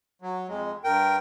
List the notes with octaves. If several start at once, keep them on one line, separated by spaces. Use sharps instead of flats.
F#3
F2 G#3
G2 A#4 G5